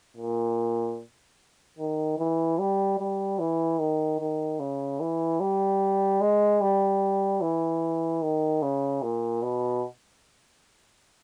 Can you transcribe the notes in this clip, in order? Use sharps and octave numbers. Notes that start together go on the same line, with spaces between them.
A#2
D#3
E3
G3
G3
E3
D#3
D#3
C#3
E3
G3
G#3
G3
E3
D#3
C#3
A#2
B2